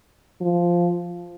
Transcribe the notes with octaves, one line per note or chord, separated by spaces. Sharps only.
F3